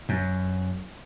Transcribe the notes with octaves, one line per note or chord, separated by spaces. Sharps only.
F#2